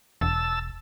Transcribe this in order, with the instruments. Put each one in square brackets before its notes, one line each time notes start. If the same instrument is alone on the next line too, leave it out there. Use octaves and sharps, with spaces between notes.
[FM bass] E1 [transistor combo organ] A5 E6